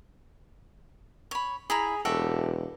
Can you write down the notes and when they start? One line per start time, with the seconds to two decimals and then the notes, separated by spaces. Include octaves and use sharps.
1.31 C#5 B5
1.70 E4 G#4 A#5 B5
2.05 E1 F#4 G4 A4 E5